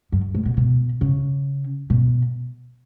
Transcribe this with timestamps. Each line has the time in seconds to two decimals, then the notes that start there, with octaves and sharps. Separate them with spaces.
0.12 F#2
0.35 A2
0.45 B2
0.57 B2
1.01 C#3
1.90 B2